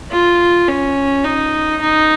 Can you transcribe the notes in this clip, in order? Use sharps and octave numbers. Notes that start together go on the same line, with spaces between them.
F4
C#4
D#4
D#4